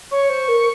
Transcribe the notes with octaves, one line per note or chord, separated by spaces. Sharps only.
C#5 C#6
C5
A#4